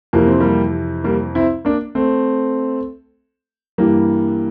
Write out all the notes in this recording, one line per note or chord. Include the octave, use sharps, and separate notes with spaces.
F2 C3 E3 A#3
C4
G3 A#3
G3 A#3
C4 E4
A#3 D4
A3 C4
G2 E3 G3 A#3